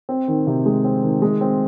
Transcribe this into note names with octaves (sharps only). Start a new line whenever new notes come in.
C4
D#3
C3
G#3
C4
D#3
G#3
C4